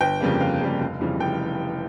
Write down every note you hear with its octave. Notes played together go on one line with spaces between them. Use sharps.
G1 G5
F2 C#3 G3 A#3
G1 F5
F2 C#3 G3 A#3
F1
F2 C#3 E3 G3
F1 G5